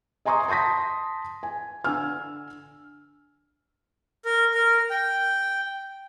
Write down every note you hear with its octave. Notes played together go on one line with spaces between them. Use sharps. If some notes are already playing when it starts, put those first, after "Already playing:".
D#5 G#5 A#5 C6 C#6 D#6
A5 C6 D#6 A#6 B6
G#5
D3 G#5 E6 F6
A#4
A#4
G5